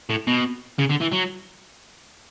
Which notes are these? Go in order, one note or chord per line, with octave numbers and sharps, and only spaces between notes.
A2
B2
C#3
D3
E3
F#3